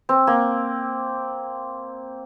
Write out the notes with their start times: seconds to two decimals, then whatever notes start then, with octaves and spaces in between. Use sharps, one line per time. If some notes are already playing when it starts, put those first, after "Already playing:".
0.09 C4
0.27 A#3